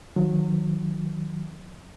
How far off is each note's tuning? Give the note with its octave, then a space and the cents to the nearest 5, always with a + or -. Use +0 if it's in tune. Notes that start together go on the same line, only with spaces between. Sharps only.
D#3 +0 F#3 -30